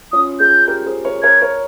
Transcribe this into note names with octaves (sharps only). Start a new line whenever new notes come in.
C#4 F4 D#6
F4 G#4 G6
G4 A#4
G#4 C5
A#4 C#5
A#4 C#5 G#6
A#4 C#5